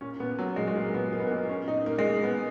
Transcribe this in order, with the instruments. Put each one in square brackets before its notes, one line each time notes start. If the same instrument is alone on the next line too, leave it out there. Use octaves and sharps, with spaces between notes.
[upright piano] A#2 C#4
A#2 B3
A#2 F#3
A#2 G#3
G#3
A#2 A#3
A#2 B3
A#2 A#3
B3
A#3
A#2
A#2 C#4
A#2 D#4
A#2 A#3
G#3
A#2
A#3
A#2 B3